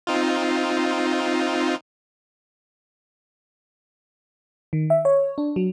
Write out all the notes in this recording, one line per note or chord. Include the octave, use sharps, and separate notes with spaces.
C4 D#4 F4
D#3
E5
C#5
D4
F#3